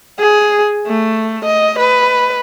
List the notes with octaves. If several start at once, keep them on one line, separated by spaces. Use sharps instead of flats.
G#4
A3
D#5
B4